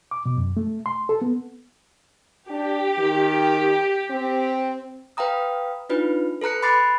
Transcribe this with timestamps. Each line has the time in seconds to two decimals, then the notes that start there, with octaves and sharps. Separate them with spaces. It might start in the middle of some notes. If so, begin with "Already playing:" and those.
0.11 D6
0.26 B2
0.37 F#2
0.57 A3
0.86 C6
1.09 A4
1.22 B3
2.50 D4 G4
2.99 D#3
4.10 C4
5.17 B4 F5 G5 A#5 D#6
5.89 D4 D#4 F4 B4
6.41 A4 B4 A#5 F#6 C#7
6.62 B5 C6 D6 F#6 A6 C7